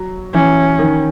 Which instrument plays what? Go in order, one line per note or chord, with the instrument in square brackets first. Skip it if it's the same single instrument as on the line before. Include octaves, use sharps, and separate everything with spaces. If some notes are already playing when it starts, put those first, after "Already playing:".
Already playing: [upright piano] F#3
[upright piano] E3 [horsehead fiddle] C#4
[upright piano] D#3